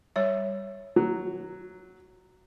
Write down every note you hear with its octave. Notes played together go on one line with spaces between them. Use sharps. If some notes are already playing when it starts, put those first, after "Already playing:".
G3 C#5 E5
F#3